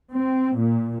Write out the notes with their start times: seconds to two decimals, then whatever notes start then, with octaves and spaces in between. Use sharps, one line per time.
0.12 C4
0.57 A#2